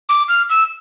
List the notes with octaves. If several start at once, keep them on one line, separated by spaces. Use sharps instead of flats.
D6
F6
E6